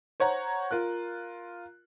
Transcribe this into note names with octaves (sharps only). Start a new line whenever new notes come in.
C5 C#5 F#5 A#5
F4 A#4 F#6